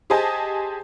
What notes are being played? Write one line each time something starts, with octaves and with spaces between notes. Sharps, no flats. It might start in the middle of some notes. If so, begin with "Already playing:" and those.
G4 G#4 C5 D#5 G#5 A5